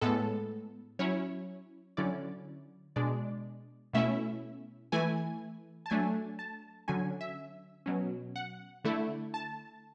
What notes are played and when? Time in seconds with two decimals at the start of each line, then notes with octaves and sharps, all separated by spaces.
0.01 A2 G#3 B3 A4
0.99 F#3 C#4 E4 C#5
1.97 D3 F#3 C#4 E4 D5
2.96 B2 G#3 D4 D5
3.93 B2 A3 C#4 E4 E5
4.92 E3 A3 E4 G#5
5.86 A5
5.90 F#3 A3 D4 G#5
6.39 A5
6.88 D3 F#3 C#4 G#5
7.21 E5
7.86 B2 F#3 C#4
8.36 F#5
8.84 D3 A3 E4
9.34 A5